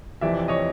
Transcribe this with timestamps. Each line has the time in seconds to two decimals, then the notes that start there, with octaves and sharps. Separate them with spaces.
0.21 F2 C3 E3 D5 E5
0.48 C#5 D#5